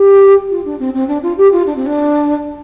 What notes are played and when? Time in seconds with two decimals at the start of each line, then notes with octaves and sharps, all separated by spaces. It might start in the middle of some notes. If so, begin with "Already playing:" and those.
Already playing: G4
0.50 F4
0.65 D4
0.79 C4
0.94 C4
1.08 D4
1.23 F4
1.37 G4
1.52 F4
1.66 D4
1.76 C4
1.86 D4